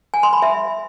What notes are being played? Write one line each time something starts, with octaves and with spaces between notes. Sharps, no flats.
G#5
C6
B5
E5